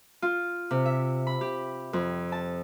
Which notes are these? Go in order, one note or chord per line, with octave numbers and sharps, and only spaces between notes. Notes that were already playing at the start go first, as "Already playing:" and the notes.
F4
C3
E5
B5
G4
F2
A5